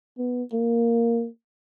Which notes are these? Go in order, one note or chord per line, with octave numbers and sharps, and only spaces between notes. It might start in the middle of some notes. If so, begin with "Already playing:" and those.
B3
A#3